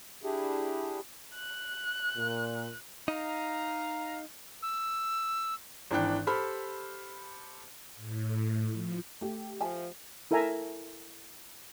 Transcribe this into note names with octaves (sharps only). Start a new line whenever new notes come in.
D4 E4 G4 G#4
F#6
A#2
D#4 F5 A#5
E6
G#1 E3 D4 G5 F#6
G4 A4 C5 B5 F6
A2
F3
A3 G4
F3 E5 G#5 A5
E4 A4 A#4 E5 G#5 A#5